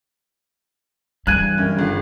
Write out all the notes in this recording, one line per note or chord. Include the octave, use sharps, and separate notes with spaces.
G2 E3 G3 G#5 F#6
F#2
G1 C#3